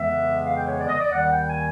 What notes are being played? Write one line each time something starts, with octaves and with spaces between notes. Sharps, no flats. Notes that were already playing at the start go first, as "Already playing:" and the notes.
Already playing: F2 C#3 E3 G#3 B3 E5
F5
G5
C#5
D5
D#5
D5
D#2 D#3 G3 F#5
G5
G#5